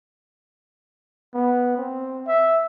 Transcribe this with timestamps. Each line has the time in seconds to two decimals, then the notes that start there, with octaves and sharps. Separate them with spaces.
1.34 B3
1.77 C4
2.27 E5